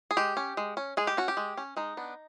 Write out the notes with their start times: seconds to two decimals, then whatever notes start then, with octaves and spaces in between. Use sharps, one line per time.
0.11 G#4
0.17 G#3 G4
0.37 C#4
0.57 G#3
0.77 C#4
0.97 G#3 G#4
1.07 G4
1.17 C#4 F#4
1.28 G4
1.37 G#3
1.57 C#4
1.77 G#3 D#4
1.97 B3 D4